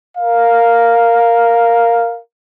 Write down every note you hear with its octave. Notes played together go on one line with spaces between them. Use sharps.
A#4 F5